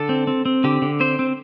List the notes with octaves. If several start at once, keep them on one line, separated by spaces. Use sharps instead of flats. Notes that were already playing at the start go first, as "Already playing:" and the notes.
Already playing: D3 A4
C4
C4
C4
D3 G4
D3
C4 C5
C4